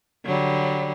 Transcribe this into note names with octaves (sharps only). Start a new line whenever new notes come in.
D3 F#3 G3